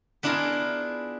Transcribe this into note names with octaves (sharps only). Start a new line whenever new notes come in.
B3 D4 E4 F4 G#4 A#4